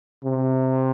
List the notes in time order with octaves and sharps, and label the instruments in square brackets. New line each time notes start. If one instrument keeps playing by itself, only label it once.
[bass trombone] C3